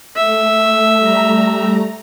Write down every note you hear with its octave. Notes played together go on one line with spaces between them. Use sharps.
A3 E5
G3 A3 A#5